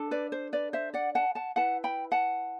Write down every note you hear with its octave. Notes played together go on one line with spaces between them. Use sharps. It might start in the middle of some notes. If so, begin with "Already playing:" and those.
Already playing: D4 A4
B4 D5
C5
B4 D5
C5 E5
D5 F#5
F#5 A5
F#5 A5
E4 B4 F#5 A5
G5 B5
F#5 A5